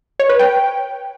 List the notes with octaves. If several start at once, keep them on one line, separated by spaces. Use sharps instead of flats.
C#5
B4
G5